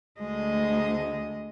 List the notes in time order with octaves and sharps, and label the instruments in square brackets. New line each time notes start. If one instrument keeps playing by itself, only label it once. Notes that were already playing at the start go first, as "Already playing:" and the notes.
[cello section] D2 [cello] G#3 D#5